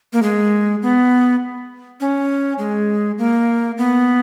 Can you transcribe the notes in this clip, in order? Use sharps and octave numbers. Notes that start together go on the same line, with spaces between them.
A#3
G#3
B3
C#4
G#3
A#3
B3